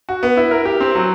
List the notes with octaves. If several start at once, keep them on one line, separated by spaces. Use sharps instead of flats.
F#4
B3
E4
A#4
G4
C4
F#3